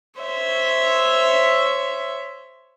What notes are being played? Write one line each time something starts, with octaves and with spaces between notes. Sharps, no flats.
C5 C#5 E5